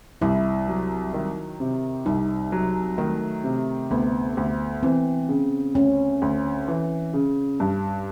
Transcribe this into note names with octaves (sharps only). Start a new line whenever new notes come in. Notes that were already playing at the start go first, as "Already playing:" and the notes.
C2 E4
F#3
D#3
C3
C2 D#4
F#3
D#3 A3
C3
D2 B3
D2
E3 C4
C#3
D2 C#4
D2
E3
C#3
G2